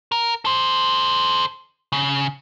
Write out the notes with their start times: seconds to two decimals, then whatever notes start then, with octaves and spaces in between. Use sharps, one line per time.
0.12 A#4
0.45 A4 C5
1.92 C#3